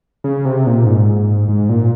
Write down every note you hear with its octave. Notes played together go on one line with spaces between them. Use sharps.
C#3
C3
A#2
G#2
G#2
A#2